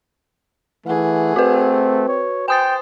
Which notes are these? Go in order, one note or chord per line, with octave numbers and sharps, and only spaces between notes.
E3 A3 G#4 F#5
C4 F#4 B4
C#5
C5 G5 G#5 D#6 A6